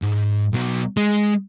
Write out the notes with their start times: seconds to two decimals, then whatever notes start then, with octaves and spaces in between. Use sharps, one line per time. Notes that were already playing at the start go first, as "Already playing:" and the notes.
0.03 G#2
0.54 B1 F#3
0.97 G#3